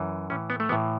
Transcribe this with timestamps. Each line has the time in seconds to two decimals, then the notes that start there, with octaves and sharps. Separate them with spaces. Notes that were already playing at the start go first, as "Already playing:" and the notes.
Already playing: F#2 E3
0.30 A2 E3 C#4
0.50 B3
0.60 A3
0.69 A2 E3 B3